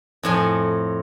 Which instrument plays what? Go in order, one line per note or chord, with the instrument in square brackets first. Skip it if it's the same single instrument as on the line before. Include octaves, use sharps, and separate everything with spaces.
[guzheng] F2 A2 G#5